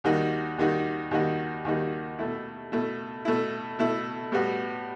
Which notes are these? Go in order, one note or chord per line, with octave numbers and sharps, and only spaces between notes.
D#2 D#3 G3 D#4 F#4
D#2 D#3 G3 D#4 F#4
D#2 D#3 G3 D#4 F#4
D#2 D#3 G3 D#4 F#4
B2 A3 E4
B2 A3 E4
B2 A3 E4
B2 A3 E4
A2 G3 B3 F#4